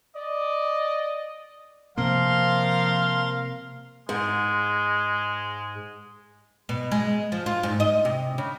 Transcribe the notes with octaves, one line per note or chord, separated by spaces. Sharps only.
D5 D#5
C3 F3 A#3 A#4 F5 C6
G#2 G#3
B2
G#3
F3
F4
G#2
D#5
C3
C#3